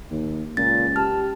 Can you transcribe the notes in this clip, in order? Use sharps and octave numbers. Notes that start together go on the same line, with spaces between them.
D#2
C#2 A#2 A6
G4 A5 F6